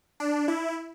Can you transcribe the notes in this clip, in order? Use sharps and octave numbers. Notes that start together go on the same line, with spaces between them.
D4
E4